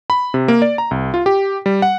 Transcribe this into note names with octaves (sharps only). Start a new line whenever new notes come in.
B5
C3
A#3
D5
A#5
C2
F4
G4
G3
F#5